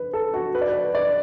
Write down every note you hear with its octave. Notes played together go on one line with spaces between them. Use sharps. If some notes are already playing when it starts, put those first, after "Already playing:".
Already playing: B4
A4
F#4
B4
D5
B4
D5